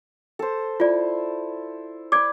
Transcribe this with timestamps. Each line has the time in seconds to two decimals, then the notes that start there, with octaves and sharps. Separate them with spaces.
0.39 A4 C5
0.80 E4 F4 D5
2.12 D5 B5 D6 G#6